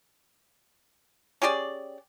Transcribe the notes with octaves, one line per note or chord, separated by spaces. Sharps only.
C#4 G4 G#4 D5